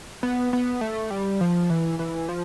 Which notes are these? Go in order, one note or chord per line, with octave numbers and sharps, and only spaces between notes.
B3
B3
A3
G3
F3
E3
E3
F3